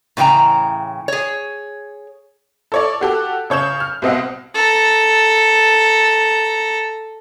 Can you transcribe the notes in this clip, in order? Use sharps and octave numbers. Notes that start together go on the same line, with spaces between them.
A2 C#3 E3 G5 A#5
G#4 C#5
A4 C#5 D5
F#4 G4 A4
C#3 C#5 G6 E7
F6
C2 B2 C4 D#5 F5 F#5
A4 A#5